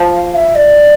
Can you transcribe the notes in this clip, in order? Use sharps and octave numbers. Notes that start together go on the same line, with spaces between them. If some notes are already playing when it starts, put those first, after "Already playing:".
Already playing: F3
F5
E5
D5